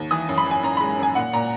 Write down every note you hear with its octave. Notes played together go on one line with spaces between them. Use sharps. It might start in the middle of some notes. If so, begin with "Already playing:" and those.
Already playing: D#2
E3 D#6
F#2
B5
E3
G#5
F#2 A#5
G#3 B5
F#2 G#5
A#2 F#5
A#2 A#5